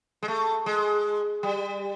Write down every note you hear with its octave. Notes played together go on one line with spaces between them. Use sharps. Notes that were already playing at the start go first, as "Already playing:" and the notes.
G#3
A3
G#3
G3